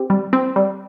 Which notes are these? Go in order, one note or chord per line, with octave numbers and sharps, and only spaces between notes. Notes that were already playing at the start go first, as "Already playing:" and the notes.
Already playing: C4 G4
G3
C4
G3